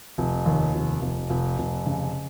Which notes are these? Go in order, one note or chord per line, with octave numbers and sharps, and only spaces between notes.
F1
D#2
F1
F1
F1
F1
C#3